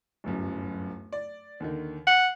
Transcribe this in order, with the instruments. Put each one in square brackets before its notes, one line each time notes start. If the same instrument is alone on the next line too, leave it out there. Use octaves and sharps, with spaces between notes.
[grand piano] D1 G1 F#2
D5
D#2 D3 D#3
[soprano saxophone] F#5 [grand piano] F#6 C7